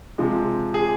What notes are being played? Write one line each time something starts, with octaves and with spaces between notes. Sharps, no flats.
C3 F3 G#3
G#4